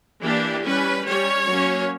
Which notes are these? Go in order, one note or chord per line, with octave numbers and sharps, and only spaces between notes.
E3 A#3 D4 G4
G3 C#4 B4
G3 C#4 C#5
F#3 A#3 C#4